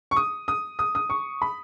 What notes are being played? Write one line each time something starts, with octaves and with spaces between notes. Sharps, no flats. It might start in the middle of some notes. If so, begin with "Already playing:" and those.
C#6
D#6
D#6
D#6
D#6
C#6
B5